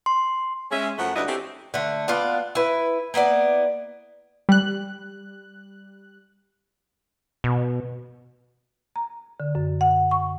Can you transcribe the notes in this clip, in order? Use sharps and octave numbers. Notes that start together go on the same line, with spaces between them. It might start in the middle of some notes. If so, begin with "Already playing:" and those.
C6
G#3 C#4 E5
F#2 F3 A3 F#5
D2 G3 E4 B4 D5 D#5
C4 C#4 E4 G4 A4
D3 A3
B3 D4 F4 F5
E4 B4
A#3 B3 E4 D5
G3 F#6
B2
A#5
D3
F#2
F#5
C#6